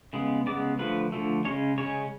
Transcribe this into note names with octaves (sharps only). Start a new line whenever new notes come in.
C#3 G#3 B3
C#3 G#3 B3 D5
D3 F3 A3 B4
D3 F3 A3
C#3 G#3 C#4 C#5
C#3 G#3 C#4 C#5